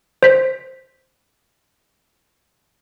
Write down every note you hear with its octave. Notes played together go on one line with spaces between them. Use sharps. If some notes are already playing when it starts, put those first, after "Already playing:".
C5 B6